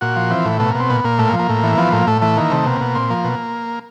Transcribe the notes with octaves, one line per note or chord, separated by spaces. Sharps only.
A#2 F#4
F3
E3 C4
A2
B2 A3
B2 A#3
C4
A#2 B3
A#2 A#3
A2 A3
A#3
F3
A#3
A2
E3
F3 B3
A2 A#3
A2 A3
E3 A3
D#3 A#3
C3 A3
B2 A#3
B2
A#2 C4
F3 A#3
B2